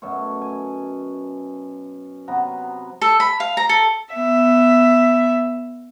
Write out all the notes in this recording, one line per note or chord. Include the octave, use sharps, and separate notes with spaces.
F#2 B2 A3 C#5
G#5
C3 F#3 B3 A#5
A4
B5
F5
A#5
A4
B3 E5